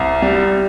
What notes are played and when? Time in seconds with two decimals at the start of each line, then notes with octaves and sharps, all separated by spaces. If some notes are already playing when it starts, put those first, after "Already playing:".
Already playing: C2
0.22 G3